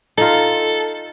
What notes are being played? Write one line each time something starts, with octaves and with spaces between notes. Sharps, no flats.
D#4 F4 A4